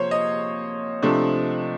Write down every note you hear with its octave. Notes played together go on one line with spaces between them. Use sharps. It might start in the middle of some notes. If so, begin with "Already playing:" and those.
Already playing: C3 F3 A#3 C5 C#5
D#5
C3 F3 A3 D4